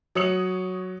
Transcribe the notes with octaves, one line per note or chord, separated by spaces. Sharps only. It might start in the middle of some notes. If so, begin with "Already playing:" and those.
F#3 C#5 D#6 C#7 F#7